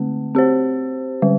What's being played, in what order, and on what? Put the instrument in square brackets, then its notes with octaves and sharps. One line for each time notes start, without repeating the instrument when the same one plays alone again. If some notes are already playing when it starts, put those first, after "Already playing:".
Already playing: [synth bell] D3 A3 C4
C4 G4 C5
D3 G3